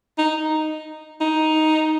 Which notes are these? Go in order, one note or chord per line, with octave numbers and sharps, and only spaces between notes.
D#4
D#4